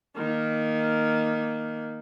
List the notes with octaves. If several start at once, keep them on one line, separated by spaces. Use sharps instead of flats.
D#3 A#3